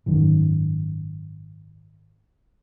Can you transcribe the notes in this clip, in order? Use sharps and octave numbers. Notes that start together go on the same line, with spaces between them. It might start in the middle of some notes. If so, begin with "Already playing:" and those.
G#1 F#2 D#3